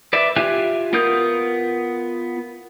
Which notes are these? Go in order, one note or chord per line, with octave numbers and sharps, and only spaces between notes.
B4 D5 E5
F4 G4 E5 G#5 F#6
B3 F4 A#4 D#6 G6